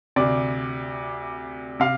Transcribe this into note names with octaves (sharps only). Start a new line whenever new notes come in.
D2 C3 D5
C3 F5